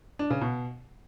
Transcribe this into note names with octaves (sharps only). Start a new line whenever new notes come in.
D4
C#3
B2